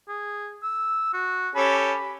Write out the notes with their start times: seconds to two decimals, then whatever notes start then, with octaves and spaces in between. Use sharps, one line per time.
0.08 G#4
0.63 E6
1.14 F#4
1.55 C#4 G4 A4 B5
1.79 B5